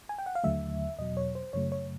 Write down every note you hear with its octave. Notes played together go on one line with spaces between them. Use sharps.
G#5
G5
F#5
F5
D#2 D3 F#3 A3 E5
E2 B2 F#3 D#5
C#5
C5
F#2 C#3 F#3 A3 C#5
C#5